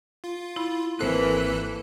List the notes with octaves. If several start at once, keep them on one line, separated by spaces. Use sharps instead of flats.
F4
E4 B5
G#1 E3 A#3 C4 A4 C5 F#6